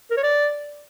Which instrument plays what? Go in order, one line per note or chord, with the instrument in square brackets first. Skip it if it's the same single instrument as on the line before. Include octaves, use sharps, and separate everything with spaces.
[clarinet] A#4
C#5
D5